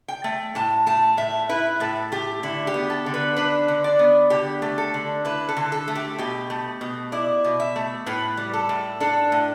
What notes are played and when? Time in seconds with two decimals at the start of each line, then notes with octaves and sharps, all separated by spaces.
0.08 G5
0.24 A3
0.55 A2 A5
0.86 A3 A5
1.17 A2 E5
1.49 E4 B4
1.80 A2 A4
2.12 A3 G4
2.43 D3 E4
2.67 G4
2.74 B3
2.90 A4
3.06 D3
3.14 B4
3.37 D4 B4
3.68 D3
3.84 D5
3.99 B3
4.30 D3 G4
4.62 A3
4.78 A4
4.94 D3
5.25 E4 B4
5.49 A4
5.57 D3
5.72 A4
5.88 A3
5.95 G4
6.18 B2 G4
6.50 A3
6.81 B2
7.12 E4 D5
7.44 B2
7.60 E5
7.76 A3
8.06 A2 B4
8.37 G3
8.53 A4
8.69 A2
9.00 D4 A4
9.32 A2